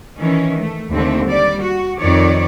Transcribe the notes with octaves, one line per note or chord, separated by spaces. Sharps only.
D#3 E3 C#4
A3
D#2 D3 A3 C4
G3 D5
F#4
F2 D#3 C#5 D5